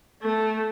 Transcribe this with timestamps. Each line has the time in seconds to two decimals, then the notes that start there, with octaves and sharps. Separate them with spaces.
0.22 A3